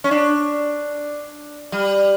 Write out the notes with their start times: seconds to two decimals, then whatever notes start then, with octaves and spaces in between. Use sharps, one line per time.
0.04 C#4
0.11 D4
1.72 G3